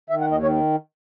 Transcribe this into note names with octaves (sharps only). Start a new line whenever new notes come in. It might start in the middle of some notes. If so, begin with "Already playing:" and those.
D#3 E5
F#5
D#2
D#5
D#3 C#5